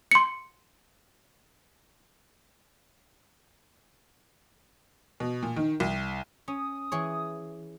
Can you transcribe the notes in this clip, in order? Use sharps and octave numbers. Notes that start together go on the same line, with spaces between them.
C6 C#7
B2
A#2
D#3
C2
C#4 D#6
E3 G#4 C#5